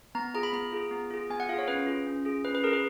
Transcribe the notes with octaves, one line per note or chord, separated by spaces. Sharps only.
B3 A#5
F4 G#4 A#5
B5
B3 A#5
F4 G#4
B3
F4 G#4
B3 G#5
F#5
F4 G#4 C#5 F5
C#4 B4
F4 G#4
C#4
F4 G#4
C#4 B4
B4
F4 G#4 A#4
B4